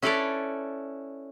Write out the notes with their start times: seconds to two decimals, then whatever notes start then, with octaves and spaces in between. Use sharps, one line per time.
0.02 C#4 E4 A4 B4 C#5 D5